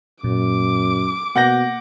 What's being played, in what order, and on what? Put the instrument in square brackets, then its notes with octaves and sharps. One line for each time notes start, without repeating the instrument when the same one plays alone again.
[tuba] F#2 [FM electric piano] A#2 [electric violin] D6
[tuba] B2 [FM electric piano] A#3 [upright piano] F#5 G6 A#6